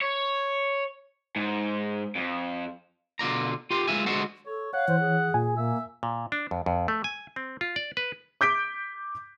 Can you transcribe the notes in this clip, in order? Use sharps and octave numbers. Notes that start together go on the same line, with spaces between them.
C#5
G#2
F2
B2 D3 F4 D5 A#5
F4 G4 C6
G#3 F4 E5 G#5
D3 G#3 F#4 A4 C5
A4 C#5
C#5 F5 F#5
E3 C5
G#4
A#2 G#5
A#3 E5
A#2
D4
F2
F2
A3
G#5
C4
F4
D5
B4
D6 G6 B6 D7